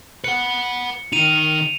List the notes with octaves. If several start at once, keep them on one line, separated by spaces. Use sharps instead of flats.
B4 F#5 C#7
D#3 D#4 D#7 F7